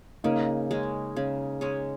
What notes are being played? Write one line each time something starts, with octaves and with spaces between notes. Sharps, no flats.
C#3 A#3 D#4
G#3 C#4
C#3
G#3 C#4